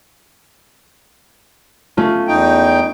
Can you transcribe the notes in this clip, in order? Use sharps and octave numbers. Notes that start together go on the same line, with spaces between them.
A3 C#4 F4
E2 D#4 G5